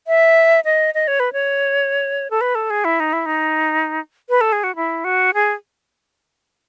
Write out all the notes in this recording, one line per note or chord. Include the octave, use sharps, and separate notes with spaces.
E5
D#5
D#5
C#5
B4
C#5
A4
B4
A4
G#4
E4
D#4
E4
D#4
B4
A4
G#4
F#4
E4
F#4
G#4